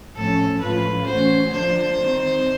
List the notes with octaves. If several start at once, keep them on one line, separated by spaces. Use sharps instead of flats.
A2 F3 A3 C#4 A4
A2 F3 G#3 C#4 F4 B4
E3 A3 C#4 F#4 C5
D3 F3 A#3 D4 F4 C5
D#3 G3 C4 D#4